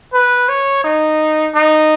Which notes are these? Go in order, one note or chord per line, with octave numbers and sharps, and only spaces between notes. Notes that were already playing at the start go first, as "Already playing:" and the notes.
B4
C#5
D#4
D#4